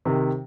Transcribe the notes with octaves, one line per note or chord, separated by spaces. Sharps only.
C3 D#3